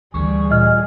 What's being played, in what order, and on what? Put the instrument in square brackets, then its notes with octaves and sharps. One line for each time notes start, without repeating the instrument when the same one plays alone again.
[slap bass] D2 E3 [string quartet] G3 G#4 [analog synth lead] C#6
[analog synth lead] A#2 [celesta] D#5 F6